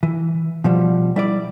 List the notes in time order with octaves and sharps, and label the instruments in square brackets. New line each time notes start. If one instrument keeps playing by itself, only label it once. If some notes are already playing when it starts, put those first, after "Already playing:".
[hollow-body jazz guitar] E3
B2 F3 G3
G3 E4 D5